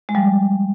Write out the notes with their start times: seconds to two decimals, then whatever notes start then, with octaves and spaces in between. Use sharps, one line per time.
0.09 G#3
0.15 F3 G3